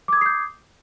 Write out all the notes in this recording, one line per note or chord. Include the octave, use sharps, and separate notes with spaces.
D6 D#6 G6 G#6 C7